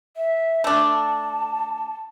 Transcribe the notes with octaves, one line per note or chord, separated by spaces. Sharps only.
E5
A3 D4
A5